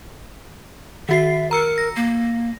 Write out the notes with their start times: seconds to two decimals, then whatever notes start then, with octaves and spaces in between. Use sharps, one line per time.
1.09 D#3 F#4 E5 C7
1.51 A#4 A#5 E6 C#7
1.78 A#6
1.96 A#3